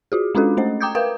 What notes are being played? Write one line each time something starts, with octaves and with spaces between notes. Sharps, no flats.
F4 F#4 G#4
G#3 C#4 D4 F4 F#4 A4
A3 C#4 C5 D#5
G5 A#5 D6 D#6 G6 G#6
A#4 B4 F5 G5 D#6